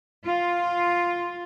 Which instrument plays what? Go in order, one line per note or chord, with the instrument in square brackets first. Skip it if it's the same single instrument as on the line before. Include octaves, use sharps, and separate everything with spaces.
[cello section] F4